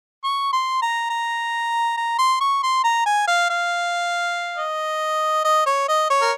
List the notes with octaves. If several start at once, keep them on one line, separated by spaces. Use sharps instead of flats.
C#6
C6
A#5
A#5
A#5
C6
C#6
C6
A#5
G#5
F5
F5
D#5
D#5
C#5
D#5
C#5
A#4